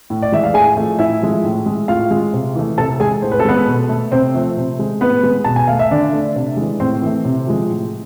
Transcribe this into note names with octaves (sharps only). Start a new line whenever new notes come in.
A2
D5
E3 G#3 E5
F5
A2 G#4 G#5
F3 A3
A2 E4 E5
F3 G#3
A2
G#3
A2 F4 F5
G#3
C3
E3 A3
C3 A4 A5
G#3 G#4 G#5
A2 C5
B4
A4
G#3 B3 B4
B2
A3
C3 C4 C5
F3 A3
C3
G#3
A2 B3 B4
G#3
B2 A5
G#5
A3 F5
E5
D3 D4 D5
A3
C3
E3 G#3
A2 C4 C5
E3 A3
C3
F3 G#3
A2